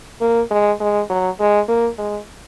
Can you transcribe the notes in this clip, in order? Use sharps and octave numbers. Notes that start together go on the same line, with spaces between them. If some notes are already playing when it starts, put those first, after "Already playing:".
A#3
G#3
G#3
F#3
G#3
A#3
G#3